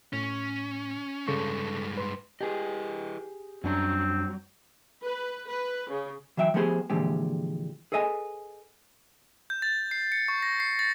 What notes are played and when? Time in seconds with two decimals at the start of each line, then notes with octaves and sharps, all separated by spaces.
0.13 A2 C#4
1.28 G2 C#3 G#3 A4 C#6
1.97 B4 C6
2.41 E4 G4 G#4 B4 D#5
3.64 F#2 F#3 G3 C4 D4 A#5
5.03 B4
5.48 B4
5.90 C#3
6.37 E3 F#3 E5 F5 G5
6.54 F3 A3 B3 G4 G#4 C5
6.90 A#2 D3 E3 F3 G#3 G4
7.92 G#4 A4 B4 D#5 F5 G#5
9.50 G6
9.62 A6
9.91 C7
10.12 C#7
10.28 C#6
10.43 A#6
10.60 C7
10.79 A6